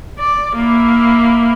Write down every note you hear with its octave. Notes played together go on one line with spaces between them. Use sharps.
D5
A#3 E4